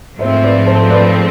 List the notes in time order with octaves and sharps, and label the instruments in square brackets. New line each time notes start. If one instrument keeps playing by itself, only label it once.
[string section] G#2 F3 A3 C4 [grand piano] C5 E5
[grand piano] B4 D5
A4 C5
B4 D5